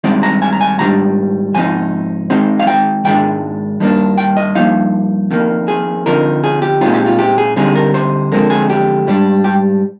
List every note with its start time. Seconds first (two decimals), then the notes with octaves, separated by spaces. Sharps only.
0.04 G2 D#3 G#3 C4 D#4 D5
0.23 A#5
0.42 G#5
0.53 A#5
0.61 G#5
0.79 G#2 D#3 G3 D4 A#5
1.54 G#2 F3 C4 D#4 G#5
2.30 D#3 G#3 C4 D#4
2.59 F5
2.67 G5
3.05 G#2 D#3 G#3 D4 G5
3.80 G2 D#3 A#3 D4
4.18 G5
4.37 D#5
4.55 G2 F3 A#3 D#4 F5
5.31 F2 D#3 A#3
5.68 G#4
6.06 D3 F3 C4 D#4 A#4
6.44 G#4
6.62 G4
6.81 A#2 G#3 C4 D#4 F4
6.94 G4
7.06 F4
7.19 G4
7.38 G#4
7.56 D3 G3 C4 D#4 G#4
7.75 A#4
7.94 C5
8.32 F2 D3 G#3 C4 A#4
8.50 G#4
8.70 G4
9.07 G#2 G3 D4
9.44 G4